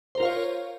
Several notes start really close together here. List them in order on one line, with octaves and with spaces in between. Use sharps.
C5 A#4 F4 F5 C#5